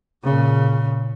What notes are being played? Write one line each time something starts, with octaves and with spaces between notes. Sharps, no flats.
A#2 C#3